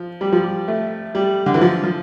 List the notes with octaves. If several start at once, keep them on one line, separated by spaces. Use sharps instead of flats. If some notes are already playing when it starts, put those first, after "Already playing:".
Already playing: F3
G3
F3
G3
A3
G3
D3
E3
F3
F3